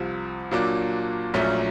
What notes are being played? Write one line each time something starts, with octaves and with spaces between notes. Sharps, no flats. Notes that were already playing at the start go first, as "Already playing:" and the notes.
Already playing: C2 C3 F3
A#2 F#3 A#3 D4
A#1 A#2 F#3 A3 C#4